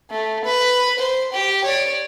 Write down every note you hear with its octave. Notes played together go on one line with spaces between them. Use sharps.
A3
B4
C5
G4
C#5 D5